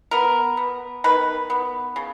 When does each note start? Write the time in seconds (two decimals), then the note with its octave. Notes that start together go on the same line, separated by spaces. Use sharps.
0.11 B3 A#4
0.57 B3
1.04 D#3 B4
1.50 B3
1.96 C#3